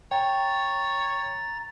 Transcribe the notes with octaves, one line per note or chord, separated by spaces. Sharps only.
C#5 G5 A#5 A6